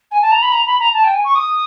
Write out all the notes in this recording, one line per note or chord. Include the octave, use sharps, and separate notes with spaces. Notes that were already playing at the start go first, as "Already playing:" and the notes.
G#5
A5
A#5
B5
A#5
B5
A#5
A5
G5
G#5
C#6
D#6